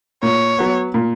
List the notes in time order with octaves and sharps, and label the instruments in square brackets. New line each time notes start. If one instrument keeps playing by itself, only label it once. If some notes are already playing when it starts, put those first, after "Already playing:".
[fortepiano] A#2 [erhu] C#5
[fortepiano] F#3 B3
A#2